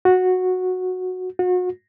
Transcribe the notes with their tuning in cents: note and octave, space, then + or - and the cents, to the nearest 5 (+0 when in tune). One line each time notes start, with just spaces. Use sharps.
F#4 -10
F#4 -35